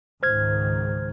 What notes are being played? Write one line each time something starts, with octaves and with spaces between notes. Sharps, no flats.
C#2 G#2 D#3 C5 F6 G#6